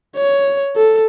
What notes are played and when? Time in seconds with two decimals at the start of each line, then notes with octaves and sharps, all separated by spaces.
0.17 C#5
0.77 A4